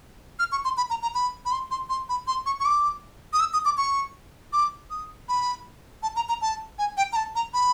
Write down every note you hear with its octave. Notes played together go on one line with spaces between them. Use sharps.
F6
C#6
C6
B5
A#5
A#5
B5
B5
C6
C6
C6
B5
C6
C#6
C#6
D6
D#6
E6
D#6
D6
C#6
D6
D#6
B5
A5
A#5
A#5
A5
G#5
G5
A#5
A5
A#5
B5